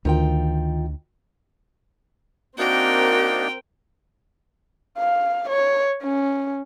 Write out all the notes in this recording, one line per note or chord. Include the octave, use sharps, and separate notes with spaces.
D2 D#3 F4 G5
A#3 C4 D4 D#4 F#4 A#4 G5
F5
C#5
C#4